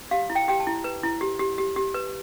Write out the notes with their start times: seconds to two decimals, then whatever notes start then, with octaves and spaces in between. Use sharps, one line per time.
0.11 G4 F5
0.30 E4
0.35 G5
0.48 G4 G5
0.60 A5
0.67 E4
0.84 B4
1.03 E4
1.21 G4
1.39 G4
1.58 G4
1.76 G4
1.94 B4